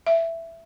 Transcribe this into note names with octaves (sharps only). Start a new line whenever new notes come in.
E5